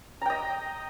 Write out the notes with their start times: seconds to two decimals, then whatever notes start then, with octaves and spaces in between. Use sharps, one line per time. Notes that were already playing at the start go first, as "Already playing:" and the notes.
0.22 A#5
0.26 G5
0.30 D#5